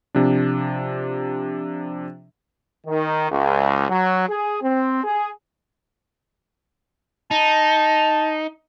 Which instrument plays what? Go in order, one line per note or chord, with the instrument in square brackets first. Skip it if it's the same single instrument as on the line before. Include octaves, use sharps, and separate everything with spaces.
[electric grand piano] C3 F3 D4
[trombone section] D#3
C#2
F#3
G#4
C4
G#4
[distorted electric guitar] D#4 [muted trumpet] A5